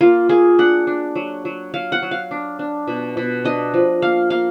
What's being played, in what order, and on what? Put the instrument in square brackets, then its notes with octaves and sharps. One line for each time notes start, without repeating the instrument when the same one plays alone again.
[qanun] A#3 F4
A#3 G#4
D4 F#5
D4
F#3
F#3
F#3 F5
F#5
F#3
F5
D4
D4
B2
B2
D4 D#5
F3
A#3 F5
A#3 F5